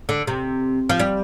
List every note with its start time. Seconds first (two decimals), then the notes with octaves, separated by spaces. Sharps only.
0.09 D3
0.27 C3
0.89 F3
1.00 G3